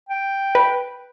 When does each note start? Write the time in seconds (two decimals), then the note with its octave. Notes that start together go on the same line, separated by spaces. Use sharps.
0.09 G5
0.55 B4